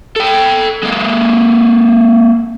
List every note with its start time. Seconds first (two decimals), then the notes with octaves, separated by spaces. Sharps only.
0.16 A4 G5
0.83 G#3 A#3